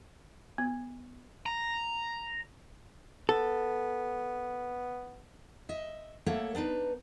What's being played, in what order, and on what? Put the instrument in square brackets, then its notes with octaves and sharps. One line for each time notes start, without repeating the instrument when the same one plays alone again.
[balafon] B3
[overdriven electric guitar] A#5
[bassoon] B3 [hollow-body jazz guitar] A4
[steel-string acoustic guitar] D#5 E5
A3 A#3 A4 C#5 E5 F#5
B3 D4 D#4 B4